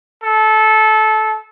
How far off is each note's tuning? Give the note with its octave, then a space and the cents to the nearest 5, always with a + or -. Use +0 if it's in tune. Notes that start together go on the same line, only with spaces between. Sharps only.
A4 -20